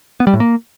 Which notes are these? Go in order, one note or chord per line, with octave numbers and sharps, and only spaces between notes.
B3
G3
A2
A#3